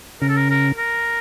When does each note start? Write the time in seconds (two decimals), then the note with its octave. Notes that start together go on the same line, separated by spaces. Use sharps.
0.21 C#3 A#4
0.29 A4
0.36 A#4
0.50 A#4
0.77 A#4